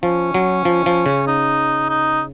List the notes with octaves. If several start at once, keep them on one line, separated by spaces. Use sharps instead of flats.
F3 C#4
F#3
F3
F3
C#3
D#4
D#4